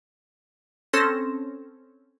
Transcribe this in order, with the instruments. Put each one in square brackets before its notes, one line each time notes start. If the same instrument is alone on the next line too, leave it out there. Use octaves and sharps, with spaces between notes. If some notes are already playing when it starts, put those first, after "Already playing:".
[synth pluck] C4 C#4 A4 C6 A#6 E7